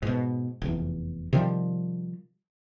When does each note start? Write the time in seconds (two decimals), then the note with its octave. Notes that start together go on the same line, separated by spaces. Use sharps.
0.02 G#2 B2
0.62 F1 E2
1.33 C3 D#3 F3 G3